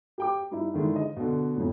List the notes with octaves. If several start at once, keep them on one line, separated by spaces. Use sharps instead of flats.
G4 G5 D6
G2 D#4 E4
D3 D#3 G#3 E4
D#5
B2 D3
F2 A2